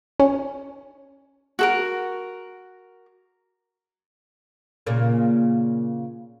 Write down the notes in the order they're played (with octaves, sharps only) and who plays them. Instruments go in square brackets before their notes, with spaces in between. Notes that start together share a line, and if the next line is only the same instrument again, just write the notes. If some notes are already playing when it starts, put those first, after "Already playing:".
[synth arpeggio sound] C#4
[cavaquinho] F#4 A4 A#4
[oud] A#2 C#3 A#3